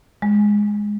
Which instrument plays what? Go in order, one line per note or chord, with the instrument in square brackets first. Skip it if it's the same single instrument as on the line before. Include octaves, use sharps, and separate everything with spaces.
[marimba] G#3